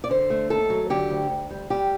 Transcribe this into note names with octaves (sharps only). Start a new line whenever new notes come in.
D5
D3 C5
A3
D#2 A4
F#3
D3 G4
D2
D2
G3
G3 G4